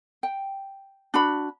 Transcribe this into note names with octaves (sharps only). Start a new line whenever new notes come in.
G5
D4 F#4 B5